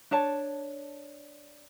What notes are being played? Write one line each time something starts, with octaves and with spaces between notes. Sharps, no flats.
D4 C#5 A5